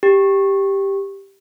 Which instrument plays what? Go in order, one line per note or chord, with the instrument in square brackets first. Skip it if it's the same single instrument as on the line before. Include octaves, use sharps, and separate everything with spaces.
[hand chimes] G4